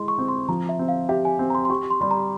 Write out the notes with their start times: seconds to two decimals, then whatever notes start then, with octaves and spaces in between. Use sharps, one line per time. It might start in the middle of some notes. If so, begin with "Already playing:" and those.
Already playing: G#3 E4 C6
0.08 C#6
0.18 C4
0.28 C6
0.48 F3 A#5
0.69 E5
0.79 C4
0.88 F5
1.09 G4 E5
1.25 G#5
1.39 C4
1.50 A#5
1.55 C6
1.65 C6
1.70 G4 C#6
1.90 C6
2.01 G3 C6
2.11 A#5